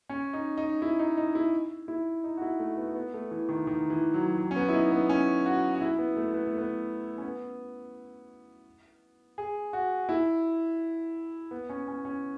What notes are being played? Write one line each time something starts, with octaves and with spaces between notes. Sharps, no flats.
C#4
D#4
D#4
E4
D#4
D#4
E4
E4
D#4
F#4
E4
A3
B3
B3
A3
E3
D#3
D#3
E3
F#3
F#3
C#4
B3
E4
D#4
B3
C#4
F#4
F#4
E4
B3
A3
B3
A3
B3
C#4
B3
G#4
F#4
E4
B3
C#4
C#4
C#4